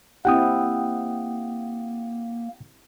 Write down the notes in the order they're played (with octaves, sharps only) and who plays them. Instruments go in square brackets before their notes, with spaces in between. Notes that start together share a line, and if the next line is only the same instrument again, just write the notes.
[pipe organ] A#3 [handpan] C4 E4 G4 [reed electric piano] F#5 G5 D#6